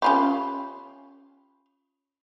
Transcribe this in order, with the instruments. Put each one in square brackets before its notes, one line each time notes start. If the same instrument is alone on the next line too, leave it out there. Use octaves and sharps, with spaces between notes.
[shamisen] C#4 F4 G4 [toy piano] B5 C#6